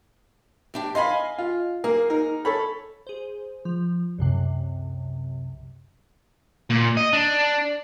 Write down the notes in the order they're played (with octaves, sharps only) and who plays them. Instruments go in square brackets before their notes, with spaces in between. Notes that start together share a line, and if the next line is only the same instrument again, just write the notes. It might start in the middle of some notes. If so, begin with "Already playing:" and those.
[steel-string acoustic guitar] A2 D4 G4
[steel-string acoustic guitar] D#5 F5 G#5 [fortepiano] B5 C6
[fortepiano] F4
[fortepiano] A#3 A#4 [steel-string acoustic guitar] G#4
[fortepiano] D#4 A#4
A4 C#5 B5
[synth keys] G#4 C5
F3
C2 F#2 C3
[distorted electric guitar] A#2
D#5
D4